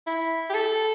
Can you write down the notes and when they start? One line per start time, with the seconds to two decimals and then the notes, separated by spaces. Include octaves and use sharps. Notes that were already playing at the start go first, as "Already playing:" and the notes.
0.06 E4
0.49 G4
0.54 A4